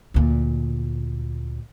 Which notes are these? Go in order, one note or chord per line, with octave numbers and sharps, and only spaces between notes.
D2 A#2